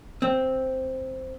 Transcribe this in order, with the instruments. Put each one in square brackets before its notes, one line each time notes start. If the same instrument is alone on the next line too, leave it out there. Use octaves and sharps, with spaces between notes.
[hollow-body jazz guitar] C4